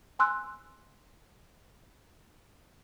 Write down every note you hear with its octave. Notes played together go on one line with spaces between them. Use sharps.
G#5 C6 E6 F#6